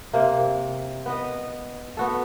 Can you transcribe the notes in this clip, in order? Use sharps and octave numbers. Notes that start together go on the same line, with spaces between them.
C3 A#3
B3 B4 D#5
B3 F#4 A4